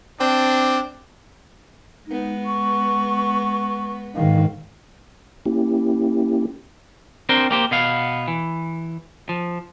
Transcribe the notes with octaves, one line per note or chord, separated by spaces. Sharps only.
C4 D4
G#3 B3 D#4
C#6
G#2 D#3 F5
A#3 C#4 E4 G4
C4 D4 A#4 C5 G5
A#3 G4 C5
B2 B3 F5
E3
F3